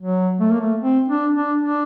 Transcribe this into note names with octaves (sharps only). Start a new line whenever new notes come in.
F#3
A3
A#3
A3
C4
D4
D4
D4